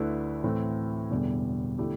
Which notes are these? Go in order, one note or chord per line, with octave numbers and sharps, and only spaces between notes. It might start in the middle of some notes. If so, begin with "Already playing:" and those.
Already playing: D2 D3 A3 E4 B4
A2 E3 A3 C4 E4
E1 E2 D3 G3
D3 A3 E4 G4